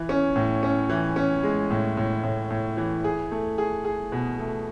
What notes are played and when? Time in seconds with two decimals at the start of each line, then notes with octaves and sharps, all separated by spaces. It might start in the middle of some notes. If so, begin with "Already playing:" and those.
Already playing: E3
0.09 C#4
0.36 A2
0.63 C#4
0.89 E3
1.16 C#4
1.43 G#3
1.70 A2
1.97 A2
2.23 A2
2.50 A2
2.77 E3
3.04 G#4
3.31 A3
3.58 G#4
3.85 G#4
4.12 B2
4.39 A3